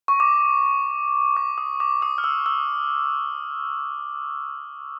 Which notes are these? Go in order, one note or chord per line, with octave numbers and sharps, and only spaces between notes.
C#6
D6
D6
D#6
D6
D#6
F6
E6
E6